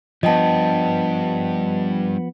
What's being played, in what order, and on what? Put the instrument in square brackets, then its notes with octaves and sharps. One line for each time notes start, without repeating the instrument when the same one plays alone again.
[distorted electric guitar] G2 [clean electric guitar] F3 B3 [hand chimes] D#5 G5 A5